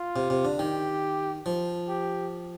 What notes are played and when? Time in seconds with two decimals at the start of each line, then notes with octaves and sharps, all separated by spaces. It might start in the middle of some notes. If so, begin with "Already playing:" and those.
Already playing: F4
0.16 C3
0.30 C3
0.45 D3
0.59 D#3 G4
1.46 F3
1.89 G4